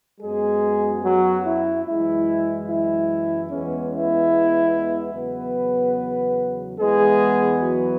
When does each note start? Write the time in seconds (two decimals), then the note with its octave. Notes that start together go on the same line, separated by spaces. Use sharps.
0.21 F#2 F#3 G#3 B3 G#4
1.03 F#3 F#4
1.44 E4
1.86 F#2 E3 G#3 E4
2.68 E4
3.50 E2 E3 G#3 B3 C#4
3.91 E4
5.14 E2 C#3 F#3 B3 B4
6.79 E2 E3 G#3 B3 G#4
7.61 F#3 F#4